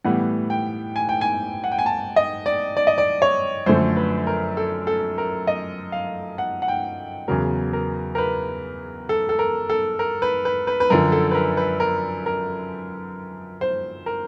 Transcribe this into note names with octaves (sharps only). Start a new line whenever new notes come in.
A2 E3 G3 B3 F#5
G5
G#5
G5
G#5
F#5
G5
G#5
A5
D#5
D5
D5
D#5
D5
C#5
F#2 D3 F3 A3 C5
B4
A#4
A4
A4
A#4
D#5
F5
F#5
F#5
G5
E2 C#3 F#3 A#4
A#4
A#4
B4
A4
A4
A#4
A4
A#4
B4
B4
B4
B4
F#2 D3 F3 A#4
A4
B4
A#4
B4
A#4
A#4
C5
A#4